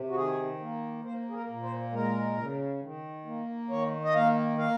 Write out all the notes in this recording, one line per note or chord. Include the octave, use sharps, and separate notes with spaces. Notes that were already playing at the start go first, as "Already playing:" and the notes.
Already playing: C3
F#4
D#3 G#4
A#3
A#3 C5
G#4
A#4
A#2
C5
G#3 A#4
C#3
D#3
A#3
D#3 C#5
D#5
A#3 F5
A#3 F5